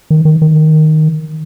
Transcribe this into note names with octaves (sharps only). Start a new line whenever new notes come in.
D#3
D#3
D#3